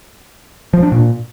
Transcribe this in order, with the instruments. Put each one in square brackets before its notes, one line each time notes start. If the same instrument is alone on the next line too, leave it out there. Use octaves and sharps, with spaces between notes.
[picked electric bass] F3
D4
A#2